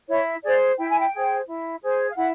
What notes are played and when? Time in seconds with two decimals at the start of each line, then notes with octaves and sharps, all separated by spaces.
0.09 E4 C#5
0.44 G#4 C5 D5
0.78 E4 G5
0.89 G#5
1.01 G5
1.13 G#4 C5
1.47 E4
1.82 G#4 C5
2.10 F5
2.16 E4 F#5